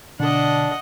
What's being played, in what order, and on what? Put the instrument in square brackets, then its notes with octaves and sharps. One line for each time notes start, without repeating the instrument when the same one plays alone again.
[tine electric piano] B2 D3 [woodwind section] D4 [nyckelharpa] D#5 F#5